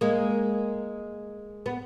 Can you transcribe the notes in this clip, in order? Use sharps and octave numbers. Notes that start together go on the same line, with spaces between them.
G#3 A#3
B3